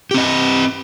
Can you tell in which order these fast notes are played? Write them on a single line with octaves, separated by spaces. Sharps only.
G4 C4 D#5